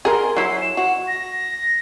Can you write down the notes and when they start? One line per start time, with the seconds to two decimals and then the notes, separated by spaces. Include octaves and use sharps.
0.05 G#4 A#4 C6
0.37 F#3 E4 C7
0.62 E7
0.77 F#4
1.08 A#6